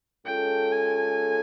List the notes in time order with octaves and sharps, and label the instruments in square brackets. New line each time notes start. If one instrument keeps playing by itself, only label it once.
[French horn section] G#3 C#4 F4 A4 [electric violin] G5
[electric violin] G#5